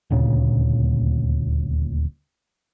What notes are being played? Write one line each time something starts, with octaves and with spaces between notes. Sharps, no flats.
D#1 D2 A#2 C#3